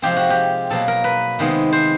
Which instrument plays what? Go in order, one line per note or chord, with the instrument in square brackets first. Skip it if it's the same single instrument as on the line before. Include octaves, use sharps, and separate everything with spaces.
[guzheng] C3 F3 G#3 C4 G4
F#4
G4
B2 F#3 A#3 A4
A#4
B4
C3 D#3 G#3 B3
C5